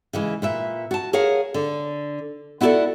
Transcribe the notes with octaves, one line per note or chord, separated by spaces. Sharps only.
C#3 E3 G#3
A#2 B4 E5
F#4 A5
G#4 A#4 C#5 F5 F#5
D3
B3 E4 F#4 G4 A4 D5